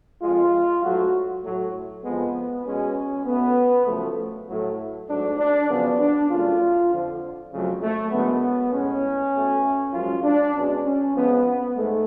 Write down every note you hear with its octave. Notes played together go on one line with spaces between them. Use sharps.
F2 F3 G#3 F4
G#2 F#3 A3 F#4
A2 F#3 A3
F2 F3 G#3 B3
B2 G#3 C#4
B2 A3 B3
F#2 C#3 F3 A3
A2 F#3 A3
G#2 F#3 A3 D4
D4
F#2 C#3 F3 B3
D4
F#2 C#3 F3 A3 F4
F2 D3 F3
F2 C#3 F#3 A3
A3
F#2 D3 G#3 B3
A2 G#3 C#4
B2 A3
F#2 F3 G#3 F4
D4
B2 G#3 C#4
C#4
F2 F3 G#3 B3
B3
G#2 G#3 A3